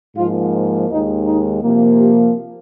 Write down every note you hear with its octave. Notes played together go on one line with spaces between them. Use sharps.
G#2 F3 A#3 F4
D#2 D#3 G#3 D#4
D#4
C3 F3 A#3
G4